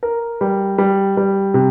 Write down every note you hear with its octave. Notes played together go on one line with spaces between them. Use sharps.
A#4
G3
G3
G3
C3